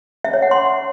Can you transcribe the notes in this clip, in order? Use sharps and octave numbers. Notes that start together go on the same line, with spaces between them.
E5
C#5
F#5
C6